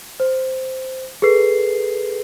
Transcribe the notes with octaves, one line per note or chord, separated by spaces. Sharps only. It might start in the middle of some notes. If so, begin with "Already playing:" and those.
C5
G#4 A4 B4 C7